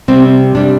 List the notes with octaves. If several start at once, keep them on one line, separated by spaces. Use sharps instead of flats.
C3 G3 C4
C3 G3 D4